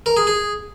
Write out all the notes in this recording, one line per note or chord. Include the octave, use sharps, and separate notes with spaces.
A#4
G#4
G#4